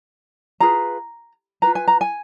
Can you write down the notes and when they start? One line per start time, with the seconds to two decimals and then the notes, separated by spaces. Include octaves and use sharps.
0.60 F4 G#4 B4 A#5
1.62 F4 B4 A#5
1.75 G#5
1.88 A#5
2.01 G#5